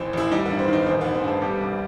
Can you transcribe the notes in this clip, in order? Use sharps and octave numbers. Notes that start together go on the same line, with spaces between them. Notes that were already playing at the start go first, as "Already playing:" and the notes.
Already playing: A1 D#2 E3 C4
A1 E4
G3 D#4
B3
G2
C4
D#3 D#4
A1 C4
B3
A1
C4
G2 A4
G3 G4
C2